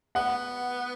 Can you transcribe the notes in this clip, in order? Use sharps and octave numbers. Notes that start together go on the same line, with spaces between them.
B3 F#5